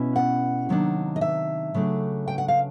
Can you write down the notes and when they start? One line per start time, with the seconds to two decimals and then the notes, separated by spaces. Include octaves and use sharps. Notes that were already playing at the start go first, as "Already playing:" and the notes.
Already playing: B2 C#4 E4
0.16 F#5
0.69 C3 D#3 F#3 A#3 D4
1.16 D#5
1.21 E5
1.74 C#3 F#3 A3 D4
2.28 G5
2.38 F#5
2.48 F5